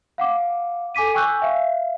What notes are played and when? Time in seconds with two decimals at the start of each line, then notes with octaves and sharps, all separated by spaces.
0.18 F5 F#5 D6
0.95 A4 G#5 D6 B6 D#7
1.14 G5 G#5 C#6 E6 F#6 G6
1.42 E5 F5